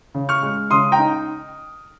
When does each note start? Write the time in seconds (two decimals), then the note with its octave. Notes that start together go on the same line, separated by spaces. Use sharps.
0.14 C#3
0.29 C#6 F6
0.42 G#3
0.71 C#3 C6 D#6
0.92 G5 A#5
0.98 D#4